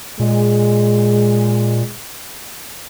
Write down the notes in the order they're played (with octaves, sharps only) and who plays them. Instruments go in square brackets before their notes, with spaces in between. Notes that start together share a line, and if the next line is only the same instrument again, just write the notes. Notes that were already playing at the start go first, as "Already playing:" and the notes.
[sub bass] A#2 [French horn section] G#3